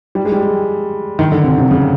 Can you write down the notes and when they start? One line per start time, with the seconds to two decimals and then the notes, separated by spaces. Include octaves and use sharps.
0.15 G3
0.25 G#3
0.32 G3
1.19 D#3
1.32 D3
1.44 C3
1.58 C3
1.71 C#3